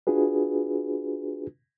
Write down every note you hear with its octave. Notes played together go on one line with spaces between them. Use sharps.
D4 F4 F#4 G#4 B4